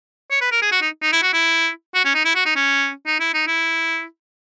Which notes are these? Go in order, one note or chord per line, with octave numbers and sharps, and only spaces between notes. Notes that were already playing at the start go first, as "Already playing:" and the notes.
C#5
B4
A#4
G#4
F#4
D#4
D#4
E4
F#4
E4
F#4
C#4
D#4
E4
F#4
D#4
C#4
D#4
E4
D#4
E4